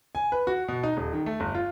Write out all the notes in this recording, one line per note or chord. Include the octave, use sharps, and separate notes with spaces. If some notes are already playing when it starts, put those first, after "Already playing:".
G#5
B4
F#4
B2
D#4
D#1
D#3
A3
G1
F4